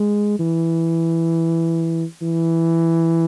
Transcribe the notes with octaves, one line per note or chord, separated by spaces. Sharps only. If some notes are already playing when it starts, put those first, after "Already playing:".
Already playing: G#3
E3
E3